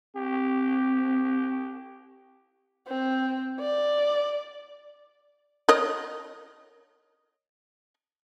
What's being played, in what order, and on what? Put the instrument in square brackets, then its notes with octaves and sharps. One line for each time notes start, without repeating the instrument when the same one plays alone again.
[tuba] C4 [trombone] G4
[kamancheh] C4
D5
[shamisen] A#4 C#5 D#5